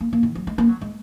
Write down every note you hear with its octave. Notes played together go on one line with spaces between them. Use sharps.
A#3
A#3
D#3
F#3
G#3
A#3
F#3
G#3